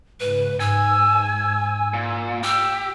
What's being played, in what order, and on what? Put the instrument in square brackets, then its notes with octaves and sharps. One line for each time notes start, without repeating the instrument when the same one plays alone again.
[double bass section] G#2 C#3 [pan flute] B4
[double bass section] G#2 [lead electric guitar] G#5 [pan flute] E6
[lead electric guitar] A#2
[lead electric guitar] G4 [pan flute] E6